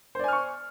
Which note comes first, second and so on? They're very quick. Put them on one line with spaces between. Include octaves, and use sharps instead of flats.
C5 D5 G#5 F6 C#6